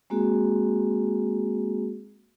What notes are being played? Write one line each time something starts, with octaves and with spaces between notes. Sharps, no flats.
G#3 A#3 C4 F#4 G#4